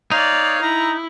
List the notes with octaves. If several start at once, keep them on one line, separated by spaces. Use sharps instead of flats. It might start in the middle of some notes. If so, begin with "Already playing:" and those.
D#4 C#5 D5 F5
E4 A#5